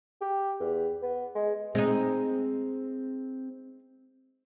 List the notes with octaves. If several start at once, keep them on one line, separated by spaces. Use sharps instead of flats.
G4
E2
B3
G#3
G#3 C4 D#4